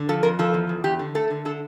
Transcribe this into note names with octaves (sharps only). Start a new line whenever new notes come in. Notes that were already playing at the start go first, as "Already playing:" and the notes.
Already playing: D3
F3 A4
F2 A#4
F3 A4
E2
E2
E2 G4
D3
A3 A4
D3
D3 A4